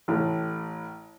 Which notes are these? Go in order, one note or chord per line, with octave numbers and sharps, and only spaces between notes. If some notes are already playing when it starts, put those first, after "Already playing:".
A1 A2